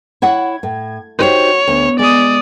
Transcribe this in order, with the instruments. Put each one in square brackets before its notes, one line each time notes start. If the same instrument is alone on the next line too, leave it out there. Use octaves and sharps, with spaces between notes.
[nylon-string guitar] E4 C#5 F#5 [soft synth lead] G#6
[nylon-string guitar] A2
[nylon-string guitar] D#4 G4 C5 [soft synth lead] F#4 [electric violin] C#5
[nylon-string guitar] D2 [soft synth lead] B3
[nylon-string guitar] G#3 [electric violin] D5 D#6